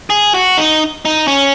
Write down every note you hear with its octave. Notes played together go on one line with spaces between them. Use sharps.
G#4
F#4
D#4
D#4
C#4